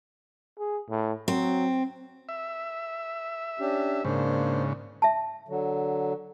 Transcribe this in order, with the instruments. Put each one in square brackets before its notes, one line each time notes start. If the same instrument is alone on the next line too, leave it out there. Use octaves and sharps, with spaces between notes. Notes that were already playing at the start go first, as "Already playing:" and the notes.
[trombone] G#4
A2
[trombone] F#3 [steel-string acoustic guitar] C4
[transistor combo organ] E5
[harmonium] C#4 D4 G4
[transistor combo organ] G#2 C#3 [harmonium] A#3 D4 C5
[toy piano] E5 A5
[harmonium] D3 F#3